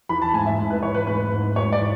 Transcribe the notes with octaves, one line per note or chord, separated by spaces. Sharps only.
E3 B5
A5
G#2 G#5
E5
G#2
B4
E3 C#5
B4
G#2 B4
G#2
G#2 C#5
D5
E3